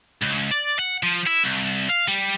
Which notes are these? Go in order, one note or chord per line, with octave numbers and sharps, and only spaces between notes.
C#2
D5
F#5
F3
E4
C2
F5
G3